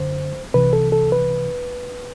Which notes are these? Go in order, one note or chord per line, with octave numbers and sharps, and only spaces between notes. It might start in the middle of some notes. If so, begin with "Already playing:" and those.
Already playing: F#2 D3 C5
C2 C3 E3 B4
A4
A4
B4